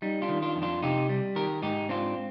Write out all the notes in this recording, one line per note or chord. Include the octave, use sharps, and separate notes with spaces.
G3 D#4
D4 F4
D#3
D4 F4
F2
D4 F4
C3 D#4 G4
G3
D#3 G4 A#4
G#2 D#4 G4
C4 D4 F4